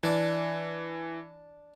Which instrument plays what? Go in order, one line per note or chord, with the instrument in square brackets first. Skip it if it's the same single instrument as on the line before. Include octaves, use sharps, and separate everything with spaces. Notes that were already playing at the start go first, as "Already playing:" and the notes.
[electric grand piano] E3 [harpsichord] D4 D5